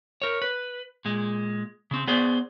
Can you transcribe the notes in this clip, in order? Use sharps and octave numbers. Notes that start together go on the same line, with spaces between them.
A#4 C#5
B4
A#2 G#3
C#3 C4
B3 G#4 C5 D5